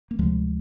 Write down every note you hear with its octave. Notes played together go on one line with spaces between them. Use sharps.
A#3
D2 C3 F3 G#3